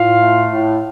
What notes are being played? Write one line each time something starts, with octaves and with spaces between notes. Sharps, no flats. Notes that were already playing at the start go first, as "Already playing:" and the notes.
Already playing: A2 F4 F5
A3
A2